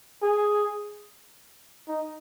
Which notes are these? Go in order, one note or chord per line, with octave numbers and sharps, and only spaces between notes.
G#4
D#4